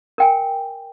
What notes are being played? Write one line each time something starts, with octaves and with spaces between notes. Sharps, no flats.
A#4 G5 G#5